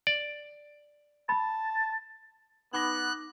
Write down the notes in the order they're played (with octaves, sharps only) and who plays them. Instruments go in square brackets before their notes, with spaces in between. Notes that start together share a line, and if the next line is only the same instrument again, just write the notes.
[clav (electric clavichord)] D5
[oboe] A5 [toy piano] B5
[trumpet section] B3 [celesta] D#4 D6 A#6 [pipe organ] F#6